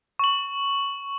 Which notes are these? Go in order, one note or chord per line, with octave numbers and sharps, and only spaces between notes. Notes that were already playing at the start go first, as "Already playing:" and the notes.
C#6 F#7